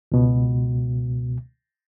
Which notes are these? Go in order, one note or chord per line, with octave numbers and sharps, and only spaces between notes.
C#2 B2